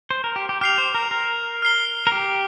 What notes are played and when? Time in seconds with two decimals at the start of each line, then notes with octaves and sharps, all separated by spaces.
0.11 C5
0.24 A#4
0.36 G4
0.49 G4
0.61 G4 F6 C7 F7
0.78 C5
0.94 A#4
1.11 A#4
1.62 F6 C7 G7
2.07 A#4
2.12 G4